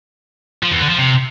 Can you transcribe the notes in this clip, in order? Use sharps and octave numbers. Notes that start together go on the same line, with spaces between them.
F3
E2
D3
F3
C3